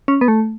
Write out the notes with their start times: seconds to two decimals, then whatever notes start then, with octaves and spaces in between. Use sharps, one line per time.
0.08 C#4
0.21 B3
0.28 A3